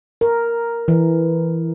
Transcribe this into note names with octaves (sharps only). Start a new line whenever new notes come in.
A#4
E3